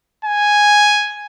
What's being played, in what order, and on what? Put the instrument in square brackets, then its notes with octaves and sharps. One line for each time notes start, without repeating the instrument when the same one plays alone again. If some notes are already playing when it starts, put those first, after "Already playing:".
[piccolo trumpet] G#5